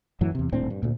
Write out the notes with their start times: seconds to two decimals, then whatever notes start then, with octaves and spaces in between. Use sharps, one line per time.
0.21 F#2 A2 E3 F#3
0.35 E2 C3
0.52 D#1 A2 C4 D4
0.70 G2
0.83 D2 A#2